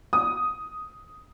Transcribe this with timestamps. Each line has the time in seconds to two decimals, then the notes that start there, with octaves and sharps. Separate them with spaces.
0.13 D#6